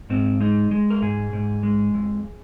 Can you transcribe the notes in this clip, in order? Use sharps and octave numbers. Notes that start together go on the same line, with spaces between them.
G#2 C4
G#3 D#4
G#3
A#4
G#2 G#4
G#2
G#3
F2